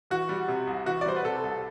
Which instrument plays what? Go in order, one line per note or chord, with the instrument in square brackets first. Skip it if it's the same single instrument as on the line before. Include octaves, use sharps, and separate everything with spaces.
[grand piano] E3 F#4
G3
C3
C2
E3 F#4
D5
G3 C5
B4
C3 A4
C2